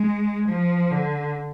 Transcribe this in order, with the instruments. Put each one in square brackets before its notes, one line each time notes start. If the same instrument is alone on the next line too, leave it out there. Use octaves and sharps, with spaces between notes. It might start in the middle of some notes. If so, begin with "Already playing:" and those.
Already playing: [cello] G#3
F3
D3